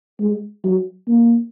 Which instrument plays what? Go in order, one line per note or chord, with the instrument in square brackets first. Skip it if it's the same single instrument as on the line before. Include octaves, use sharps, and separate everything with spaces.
[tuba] G#3
F#3
A#3